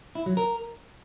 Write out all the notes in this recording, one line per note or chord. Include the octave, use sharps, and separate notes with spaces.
E4
F#3
A#4